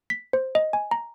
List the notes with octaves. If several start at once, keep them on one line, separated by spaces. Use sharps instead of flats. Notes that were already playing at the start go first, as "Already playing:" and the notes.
B6
C5
D#5
G#5
A#5